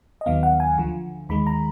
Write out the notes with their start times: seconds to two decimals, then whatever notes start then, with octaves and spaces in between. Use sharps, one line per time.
0.21 D#5
0.26 D#2 D#3 F#3 B3 F5
0.43 F#5
0.60 G#5
0.78 D2 D3 F3
1.29 D#2 D#3 G#3 B5
1.47 A#5